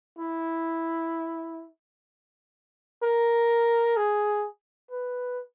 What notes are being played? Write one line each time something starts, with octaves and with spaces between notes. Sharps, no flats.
E4
A#4
G#4
B4